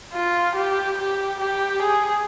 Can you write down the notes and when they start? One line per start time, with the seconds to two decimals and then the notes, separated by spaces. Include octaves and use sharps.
0.13 F4
0.56 G4
0.98 G4
1.40 G4
1.82 G#4